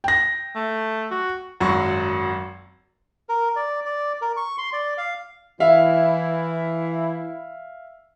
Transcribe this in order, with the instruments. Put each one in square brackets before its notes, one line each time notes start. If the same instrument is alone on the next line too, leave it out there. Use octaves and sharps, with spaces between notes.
[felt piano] G5 A#6
[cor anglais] A3
F#4
[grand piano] G#1 F#2 F#3 C#6
[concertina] A#4
D5
D5
A#4
C#6
C6
D5
F5
[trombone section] E3 E4 [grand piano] E5 F5